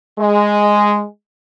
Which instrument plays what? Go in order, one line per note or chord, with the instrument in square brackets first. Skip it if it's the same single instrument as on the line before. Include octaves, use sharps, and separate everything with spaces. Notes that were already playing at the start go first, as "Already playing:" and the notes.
[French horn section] G#3